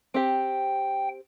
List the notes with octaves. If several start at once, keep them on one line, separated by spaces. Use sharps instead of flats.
C4 G4 G5